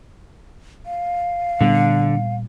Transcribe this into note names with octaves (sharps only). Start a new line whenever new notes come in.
F5
A#2 D3 G3 B3